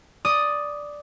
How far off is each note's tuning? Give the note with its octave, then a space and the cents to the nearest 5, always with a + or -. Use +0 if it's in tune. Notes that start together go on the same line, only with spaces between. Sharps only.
D5 +0 D#6 +0